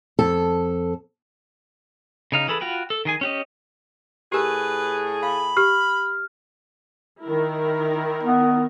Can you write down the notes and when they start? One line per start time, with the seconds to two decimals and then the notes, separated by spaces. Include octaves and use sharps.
0.19 F2 A4 A5
2.32 C#3 D#4 F5
2.48 E3 G#4 A4 B5
2.61 F4 F#4 G5 B5
2.90 A4
3.05 D#3 G#4 G#5
3.21 C#4 G4 D#5
4.32 A2 G4 G#4 A#4 B4
5.23 F5 B5
5.57 G4 F6
7.23 D#3 E4 A#4
8.23 B3